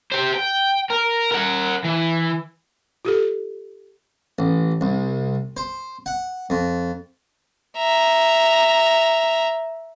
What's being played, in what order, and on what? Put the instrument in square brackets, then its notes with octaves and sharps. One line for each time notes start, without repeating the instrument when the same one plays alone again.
[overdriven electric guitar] G4 C5
G5
A#4
A#4 F#5
E3
[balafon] F4 G4 A4
[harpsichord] A1
C2
C5
F#5
F2
[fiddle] E5 A#5